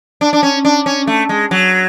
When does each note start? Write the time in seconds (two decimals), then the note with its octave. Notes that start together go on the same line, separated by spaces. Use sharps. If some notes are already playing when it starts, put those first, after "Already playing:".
0.21 D4
0.33 D4
0.43 C#4
0.65 D4
0.86 C#4
1.07 A3
1.29 G#3
1.51 F#3